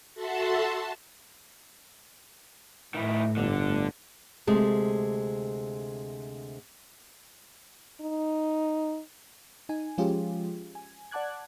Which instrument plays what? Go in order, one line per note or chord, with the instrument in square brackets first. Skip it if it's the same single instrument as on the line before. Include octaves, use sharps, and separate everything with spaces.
[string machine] F#4 A4 E5 F#5 A5 C6
[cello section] A2 [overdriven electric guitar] D#3 E4
[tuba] G1 [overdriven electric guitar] D3
[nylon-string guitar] D2 C3 G#3 A3
[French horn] D#4
[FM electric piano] D#4 G#5
F3 G#3 C#4 F4 G4 G#4
G#5
D5 F#5 A5 D6 F#6 G#6